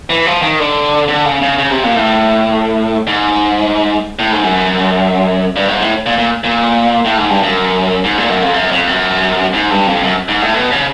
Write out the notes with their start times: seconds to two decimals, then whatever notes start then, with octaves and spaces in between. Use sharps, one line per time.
0.10 E3
0.26 F3
0.42 D#3
0.59 D3
1.08 D3
1.25 C#3
1.42 C#3
1.59 C#3
1.70 C3
1.83 A#2
1.96 A2
3.07 G#2
4.19 A2
4.32 G#2
4.44 F#2
5.56 G2
5.68 G#2
5.81 A2
6.06 A#2
6.18 A#2
6.44 A#2
7.05 A2
7.18 G#2
7.30 G2
7.43 F#2
8.04 G#2
8.18 A#2
8.29 F#2
8.42 F2
8.54 F#2
8.71 F2
8.87 F#2
9.54 G#2
9.71 G2
9.87 F2
10.04 F#2
10.28 G#2
10.41 A2
10.54 B2
10.71 C#3